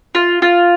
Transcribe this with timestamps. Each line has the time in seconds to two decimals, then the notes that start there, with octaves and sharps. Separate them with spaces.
0.15 F4
0.42 F4